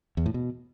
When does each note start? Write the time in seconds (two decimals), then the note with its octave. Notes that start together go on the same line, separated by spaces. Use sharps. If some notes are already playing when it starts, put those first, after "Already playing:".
0.17 E2
0.26 A2
0.34 B2